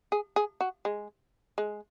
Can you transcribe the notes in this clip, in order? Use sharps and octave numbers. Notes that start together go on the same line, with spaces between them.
G#4
G#4
F#4
G#3
G#3